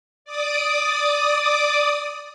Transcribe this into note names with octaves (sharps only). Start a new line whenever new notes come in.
D5 D6 D#6